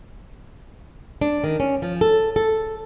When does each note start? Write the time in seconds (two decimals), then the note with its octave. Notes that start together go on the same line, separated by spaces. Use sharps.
1.21 D4
1.44 D#3
1.60 C#4
1.82 F3
2.01 A4
2.36 A4